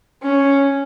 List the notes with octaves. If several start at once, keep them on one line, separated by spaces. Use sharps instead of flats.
C#4